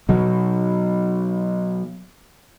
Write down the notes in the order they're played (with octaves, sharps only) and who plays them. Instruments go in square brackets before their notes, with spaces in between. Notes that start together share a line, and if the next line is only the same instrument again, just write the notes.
[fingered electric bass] B2 F#3